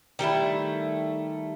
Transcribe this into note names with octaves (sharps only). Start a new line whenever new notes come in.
D#3 G3 A3 E4